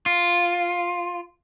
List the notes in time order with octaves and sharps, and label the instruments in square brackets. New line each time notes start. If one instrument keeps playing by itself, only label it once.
[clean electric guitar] F4